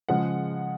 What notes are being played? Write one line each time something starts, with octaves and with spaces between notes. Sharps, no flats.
C#3 F3 G#3 F#5